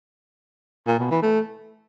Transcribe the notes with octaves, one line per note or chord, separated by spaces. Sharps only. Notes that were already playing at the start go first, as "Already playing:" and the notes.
A#2
B2
E3
A3